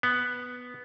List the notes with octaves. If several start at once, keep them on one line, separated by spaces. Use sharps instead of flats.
B3